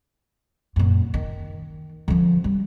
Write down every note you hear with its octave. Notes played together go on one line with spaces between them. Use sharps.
F#2 A#2
D#3
D3 F3
G3